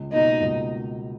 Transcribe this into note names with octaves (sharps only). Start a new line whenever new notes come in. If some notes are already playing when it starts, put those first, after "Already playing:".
Already playing: C#2
B2 A#3 D#4
C#2